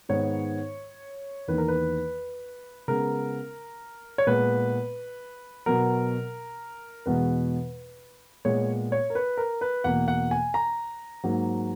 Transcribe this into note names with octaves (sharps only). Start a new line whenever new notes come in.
G#2 D#3 G#3 B3 C#5
E2 D#3 A#3 B4
A#4
B4
C#3 G#3 B3 A#4
C#5
A#2 G#3 B3 B4
B2 F#3 B3 A#4
E2 B2 G#3 B3 B4
A#2 G#3 B3 C#5
C#5
A#4
B4
A#4
B4
E2 B2 A#3 F#5
F#5
G#5
A#5
G#2 F#3 A#3